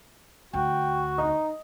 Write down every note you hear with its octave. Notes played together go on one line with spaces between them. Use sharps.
D2 F#4 G5
D#4 D#5